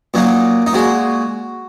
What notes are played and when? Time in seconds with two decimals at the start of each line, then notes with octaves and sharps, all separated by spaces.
0.14 A#2 F#3 A#3 D#4
0.67 D#4
0.73 A#2 G#3 F#4